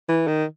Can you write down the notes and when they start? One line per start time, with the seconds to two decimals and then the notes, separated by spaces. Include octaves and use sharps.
0.09 E3
0.27 D#3